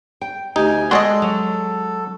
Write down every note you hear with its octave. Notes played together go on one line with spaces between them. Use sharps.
G5
D2 D#4 G4 G#5
G#3 F#4 G#4 A4 D5 D#5 C6
F#3